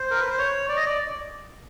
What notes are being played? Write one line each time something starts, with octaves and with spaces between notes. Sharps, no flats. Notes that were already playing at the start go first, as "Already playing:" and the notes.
Already playing: C5
A#4
B4
C5
C#5
D5
D#5
D5